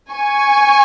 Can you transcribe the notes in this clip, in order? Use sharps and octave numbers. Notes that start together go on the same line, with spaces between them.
G#5 C#6